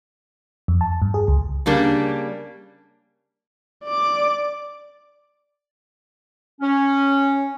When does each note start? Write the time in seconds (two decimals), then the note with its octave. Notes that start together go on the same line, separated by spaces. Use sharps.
0.68 F2
0.81 A5
1.02 G2
1.14 G#4
1.28 C#2
1.66 C#3 G3 A#3 D4
3.84 D5 D6
6.61 C#4